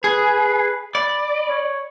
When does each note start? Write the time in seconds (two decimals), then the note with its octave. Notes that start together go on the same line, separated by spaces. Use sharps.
0.04 G#4 B4
0.95 D5 B5
1.48 C#5